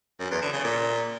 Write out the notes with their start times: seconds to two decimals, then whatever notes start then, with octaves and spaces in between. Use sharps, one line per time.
0.20 F#2
0.31 E2
0.42 D3
0.53 C#3
0.64 A#2